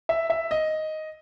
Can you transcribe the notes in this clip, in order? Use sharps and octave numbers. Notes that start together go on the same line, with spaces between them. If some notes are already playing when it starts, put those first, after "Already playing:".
E5
E5
D#5